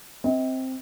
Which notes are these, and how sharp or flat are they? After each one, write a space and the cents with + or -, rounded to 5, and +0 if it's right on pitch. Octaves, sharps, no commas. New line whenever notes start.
C4 +0 D#5 +40